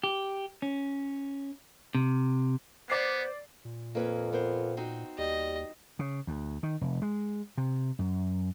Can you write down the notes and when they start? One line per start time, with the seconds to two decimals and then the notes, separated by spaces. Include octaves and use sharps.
0.04 G4
0.62 C#4
1.95 C3
2.90 B3 C5 D5 C7
3.65 A#2
3.95 F2 A#3 B4 C#5
4.33 B3 A#4 C5
4.77 C4 D#4 F#4
5.18 D#2 G3 D#5
5.99 C#3
6.27 D2
6.63 D#3
6.81 F1
7.02 G#3
7.57 C3
7.99 F#2